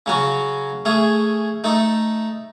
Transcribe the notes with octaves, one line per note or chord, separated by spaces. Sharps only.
C#3 F#3 C#4 F#4
A3 C#4 G#4
A3 D#4 A4